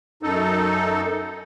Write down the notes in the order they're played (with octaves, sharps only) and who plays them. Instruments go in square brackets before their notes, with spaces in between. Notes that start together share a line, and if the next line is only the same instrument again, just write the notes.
[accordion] F#2 D#4 A4